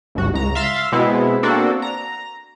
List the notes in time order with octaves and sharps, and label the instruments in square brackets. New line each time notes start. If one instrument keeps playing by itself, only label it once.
[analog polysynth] G1 C#2 G2 F#4
C#2 A#5
E5 F5 C6 A6 B6
B2 G#3 B3 C4 E4
A#3 C4 D4 F#4 A4
A#5